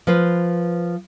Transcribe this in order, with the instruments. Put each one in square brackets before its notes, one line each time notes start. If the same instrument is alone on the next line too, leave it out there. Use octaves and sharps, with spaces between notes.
[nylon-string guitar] F3 B4 C5